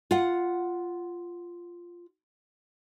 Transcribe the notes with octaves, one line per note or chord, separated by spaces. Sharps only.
F4 F#5